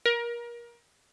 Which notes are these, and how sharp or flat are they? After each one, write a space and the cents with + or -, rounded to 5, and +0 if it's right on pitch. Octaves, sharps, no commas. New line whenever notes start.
A#4 +25